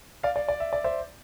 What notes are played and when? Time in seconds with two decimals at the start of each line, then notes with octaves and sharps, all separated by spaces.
0.23 D5 F5
0.36 D5
0.49 D5
0.60 E5
0.73 D5
0.84 C5 E5